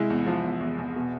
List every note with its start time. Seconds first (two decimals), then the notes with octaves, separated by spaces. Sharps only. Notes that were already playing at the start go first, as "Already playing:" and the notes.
Already playing: C2 G#3 E4
0.10 E2
0.26 F3
0.44 E2
0.60 E2
0.78 E2
0.96 B2